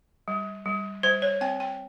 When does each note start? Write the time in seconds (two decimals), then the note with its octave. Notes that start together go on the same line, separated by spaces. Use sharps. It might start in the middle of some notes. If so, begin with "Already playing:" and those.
0.28 G3
0.66 G3
1.03 G3 C5
1.22 C#5
1.41 C4 G5
1.60 G5